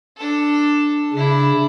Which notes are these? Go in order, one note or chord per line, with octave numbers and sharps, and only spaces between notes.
D4 A4
C#3 D4 E4